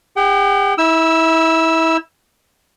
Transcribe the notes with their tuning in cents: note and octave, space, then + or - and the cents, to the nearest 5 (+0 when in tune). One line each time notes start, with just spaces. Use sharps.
G4 +45 G5 -40
E4 -25 E6 +5